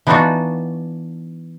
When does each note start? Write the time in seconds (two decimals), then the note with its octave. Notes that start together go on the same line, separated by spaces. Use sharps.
0.07 E3 B3 D4 D#4 F4 F#4